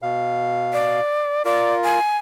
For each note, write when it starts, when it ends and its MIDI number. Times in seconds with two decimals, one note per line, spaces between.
0.02 1.00 47
0.02 1.00 77
0.73 1.43 74
1.45 1.99 65
1.45 1.99 70
1.45 1.73 74
1.84 2.17 80